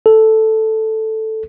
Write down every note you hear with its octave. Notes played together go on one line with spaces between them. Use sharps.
A4